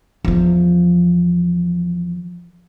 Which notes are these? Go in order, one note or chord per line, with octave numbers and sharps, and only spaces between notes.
E2 F3